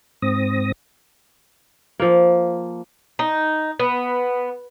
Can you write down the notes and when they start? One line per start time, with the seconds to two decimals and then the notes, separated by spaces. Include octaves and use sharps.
0.22 G#2 C4 D#6 A#6
2.00 F3 A#3
3.19 D#4
3.79 B3